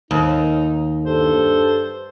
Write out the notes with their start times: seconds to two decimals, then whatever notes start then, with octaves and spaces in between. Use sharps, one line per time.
0.11 D#2 D#4
1.05 G2 A4 C5